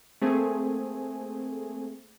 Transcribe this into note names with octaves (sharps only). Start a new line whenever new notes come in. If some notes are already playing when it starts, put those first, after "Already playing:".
A3 A#3 C4 G#4